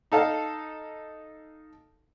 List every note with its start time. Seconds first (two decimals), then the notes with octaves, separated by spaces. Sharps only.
0.12 D#4 A4 F5 A5